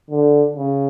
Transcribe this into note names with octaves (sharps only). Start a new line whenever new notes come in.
D3
C#3